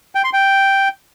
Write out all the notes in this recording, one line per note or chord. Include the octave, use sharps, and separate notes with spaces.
G5
C6
G5